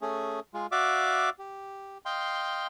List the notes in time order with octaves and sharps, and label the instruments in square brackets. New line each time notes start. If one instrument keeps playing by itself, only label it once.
[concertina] A3 C#4 G#4
G#3 F4
F#4 D5 E5 F5 D6
G4
D#5 F5 G5 C6